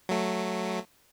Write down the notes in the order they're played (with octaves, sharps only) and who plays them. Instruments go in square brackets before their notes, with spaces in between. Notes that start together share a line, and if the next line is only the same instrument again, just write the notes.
[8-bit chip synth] F#3 A3